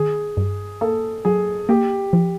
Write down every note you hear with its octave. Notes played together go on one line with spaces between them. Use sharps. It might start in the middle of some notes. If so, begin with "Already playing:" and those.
Already playing: D#3 G#4
G2
A#3 A4
F#3 G#4
A#3 G4
F3